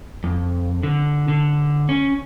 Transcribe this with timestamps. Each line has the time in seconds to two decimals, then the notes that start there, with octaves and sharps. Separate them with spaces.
0.24 F2
0.83 D3
1.28 D3
1.89 C#4